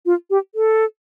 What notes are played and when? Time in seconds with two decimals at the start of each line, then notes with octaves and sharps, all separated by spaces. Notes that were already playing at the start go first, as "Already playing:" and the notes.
0.06 F4
0.30 G4
0.55 A4